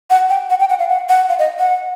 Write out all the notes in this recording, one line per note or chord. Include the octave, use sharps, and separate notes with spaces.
F#5
G5
F#5
G5
F#5
F5
F#5
F#5
F5
D#5
F#5